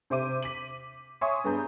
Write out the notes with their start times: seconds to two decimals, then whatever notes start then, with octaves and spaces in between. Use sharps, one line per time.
0.10 C3 C5 E5 D6 D#7
0.43 B6 D#7 F#7
1.21 C#5 E5 G#5 C6 C#6 D#6
1.44 G2 B3 G#4 A#5 G6